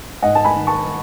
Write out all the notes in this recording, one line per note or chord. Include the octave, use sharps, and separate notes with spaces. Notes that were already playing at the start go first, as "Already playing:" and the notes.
G#2 D#5 F#5
A5
G#5 B5
D#3
A5 C#6